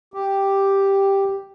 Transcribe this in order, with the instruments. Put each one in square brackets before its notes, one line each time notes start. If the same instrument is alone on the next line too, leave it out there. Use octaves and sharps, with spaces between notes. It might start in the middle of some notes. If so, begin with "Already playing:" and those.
[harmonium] G4